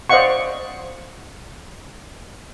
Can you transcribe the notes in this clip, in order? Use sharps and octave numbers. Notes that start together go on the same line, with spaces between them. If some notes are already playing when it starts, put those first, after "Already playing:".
C5 D5 D#5 F5 F#5 C#6